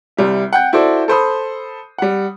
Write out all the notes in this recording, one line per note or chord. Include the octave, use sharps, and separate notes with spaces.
C2 G3 E5
F#5 G5 G6
E4 F#4 A4 C5 D5
A4 C5 B5 D#6
G3 F#5